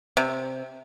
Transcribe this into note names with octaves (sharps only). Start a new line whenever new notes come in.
C3